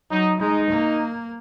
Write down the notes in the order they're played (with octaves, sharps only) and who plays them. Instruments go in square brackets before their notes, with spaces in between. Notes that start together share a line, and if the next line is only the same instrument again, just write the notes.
[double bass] F#3 [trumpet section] D#4
[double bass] G#3 [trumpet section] D#4
[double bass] A#3